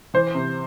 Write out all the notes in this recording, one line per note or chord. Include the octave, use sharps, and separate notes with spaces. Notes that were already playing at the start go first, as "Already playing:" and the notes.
E3 C5
C3